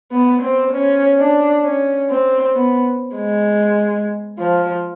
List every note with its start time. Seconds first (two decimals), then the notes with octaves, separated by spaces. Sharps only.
0.12 B3
0.42 C4
0.73 C#4
1.19 D4
1.64 C#4
2.10 C4
2.56 B3
3.17 G#3
4.38 F3